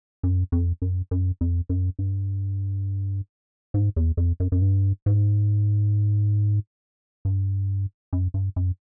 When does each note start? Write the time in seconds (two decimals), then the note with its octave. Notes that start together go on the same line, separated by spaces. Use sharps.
0.23 F#2
0.52 F2
0.82 F#2
1.11 F#2
1.41 F2
1.69 F#2
1.99 G2
3.74 G#2
3.96 E2
4.17 F2
4.40 F#2
4.52 F#2
4.62 G2
5.06 G#2
7.25 G2
8.13 F#2
8.34 G2
8.56 F#2